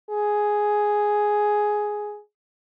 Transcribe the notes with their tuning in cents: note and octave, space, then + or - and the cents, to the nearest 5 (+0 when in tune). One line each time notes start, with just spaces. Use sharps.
G#4 +5